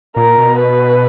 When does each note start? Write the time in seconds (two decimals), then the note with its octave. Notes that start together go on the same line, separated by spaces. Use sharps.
0.16 A#2 A#4
0.38 B2
0.59 B4